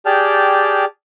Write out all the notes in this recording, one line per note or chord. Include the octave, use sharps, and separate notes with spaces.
G4 G#4 D5 G5 A5 F6